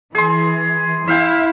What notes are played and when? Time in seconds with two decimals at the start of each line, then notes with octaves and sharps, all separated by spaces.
0.15 E3 G#4 C6
1.08 E4 E5 F5 G5